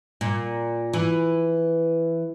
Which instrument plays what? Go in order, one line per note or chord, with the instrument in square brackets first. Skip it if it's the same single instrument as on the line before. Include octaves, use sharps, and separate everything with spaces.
[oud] A#2
E3